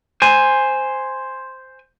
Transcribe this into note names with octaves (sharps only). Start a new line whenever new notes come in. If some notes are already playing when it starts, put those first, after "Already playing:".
C5 G#5